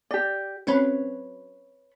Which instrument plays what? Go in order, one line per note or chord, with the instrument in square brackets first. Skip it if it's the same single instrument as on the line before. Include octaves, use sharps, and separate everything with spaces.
[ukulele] G4 D5
[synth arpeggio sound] F#3 C4 C#4 [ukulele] B4 C#5 B5